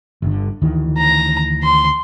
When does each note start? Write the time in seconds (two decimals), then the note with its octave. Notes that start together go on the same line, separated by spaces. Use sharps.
0.22 G1 D3
0.62 D2 D#3 E3
0.98 A#5
1.64 C6